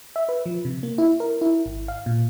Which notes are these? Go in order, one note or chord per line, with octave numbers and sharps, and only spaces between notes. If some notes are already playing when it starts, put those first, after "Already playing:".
E5
B4
F3
C3
A#3
E4
A#4
E4
G#1
F5
A#2